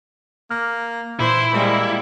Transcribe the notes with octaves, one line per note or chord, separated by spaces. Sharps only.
A#3 F6
A#2 E3 E4 C5
G3 G#3 A#3